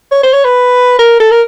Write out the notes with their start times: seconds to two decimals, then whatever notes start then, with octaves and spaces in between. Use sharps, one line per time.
0.12 C#5
0.23 C5
0.33 C#5
0.44 B4
0.99 A#4
1.20 A4
1.31 A#4